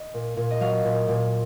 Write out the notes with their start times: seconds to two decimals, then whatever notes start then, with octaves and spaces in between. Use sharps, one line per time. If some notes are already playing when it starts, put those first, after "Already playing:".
Already playing: D#5
0.14 A#2
0.37 A#2
0.51 D#5
0.60 F#3 F5
0.85 A#2
1.08 A#2